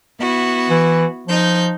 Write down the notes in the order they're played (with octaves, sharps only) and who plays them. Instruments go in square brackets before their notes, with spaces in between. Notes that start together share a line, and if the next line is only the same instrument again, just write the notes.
[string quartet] B3 E4 F#4
[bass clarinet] E3
[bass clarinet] F3 [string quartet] D#4 G6